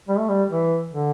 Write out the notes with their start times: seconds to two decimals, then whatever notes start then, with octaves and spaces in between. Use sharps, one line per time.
0.09 G3
0.19 A3
0.29 G3
0.50 E3
0.91 D3